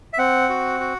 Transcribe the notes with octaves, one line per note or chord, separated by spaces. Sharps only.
E5
C4 F#5
F#4
F#4